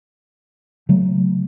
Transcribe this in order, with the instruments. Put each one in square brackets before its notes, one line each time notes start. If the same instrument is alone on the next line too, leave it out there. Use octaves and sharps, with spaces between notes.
[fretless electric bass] C#3 F#3 A3